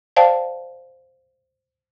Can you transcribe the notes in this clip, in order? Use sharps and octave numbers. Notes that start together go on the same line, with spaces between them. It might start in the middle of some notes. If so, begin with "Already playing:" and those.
C5 D5 F5 G5 A5